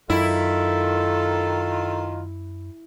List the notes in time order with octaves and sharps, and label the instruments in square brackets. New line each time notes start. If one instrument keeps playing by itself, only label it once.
[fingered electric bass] F#2 [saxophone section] D#3 F4 [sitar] E4 [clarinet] A4